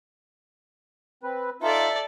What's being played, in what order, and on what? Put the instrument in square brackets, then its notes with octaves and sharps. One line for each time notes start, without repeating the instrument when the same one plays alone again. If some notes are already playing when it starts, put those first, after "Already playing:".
[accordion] C4 B4
[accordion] D#4 F4 [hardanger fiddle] A4 D5 [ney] E5